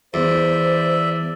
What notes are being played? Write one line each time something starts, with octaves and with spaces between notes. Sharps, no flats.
E2 C5 D5 E5